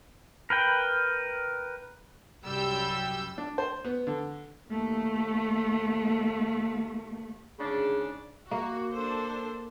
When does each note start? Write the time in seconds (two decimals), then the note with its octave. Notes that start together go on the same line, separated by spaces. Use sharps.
0.50 A#4 B4 G5
2.46 C2 F#2 G3 G4 E6 G6
3.38 D4
3.58 C5
3.85 B3
4.07 D3
4.69 D#2 A3
7.60 D2 G#2 C#3 D4 G#4
8.51 A#3 F#4
8.91 D4 A4 C5